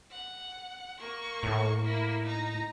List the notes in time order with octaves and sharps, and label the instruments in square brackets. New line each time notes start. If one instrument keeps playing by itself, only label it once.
[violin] F#5
A#3 C#6
[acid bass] A2
[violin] A#3 E4
D#4 A#5